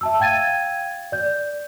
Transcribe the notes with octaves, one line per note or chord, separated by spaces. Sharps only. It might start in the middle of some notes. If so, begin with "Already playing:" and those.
E5 A5 E6
F5 G5 G#6 A6 D#7
D5 G6